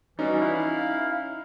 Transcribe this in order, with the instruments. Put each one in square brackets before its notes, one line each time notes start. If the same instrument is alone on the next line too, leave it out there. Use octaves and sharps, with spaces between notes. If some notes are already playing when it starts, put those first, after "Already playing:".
[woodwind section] E3 G3 F#4 [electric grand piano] C#4 D#4
[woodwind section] E4 F5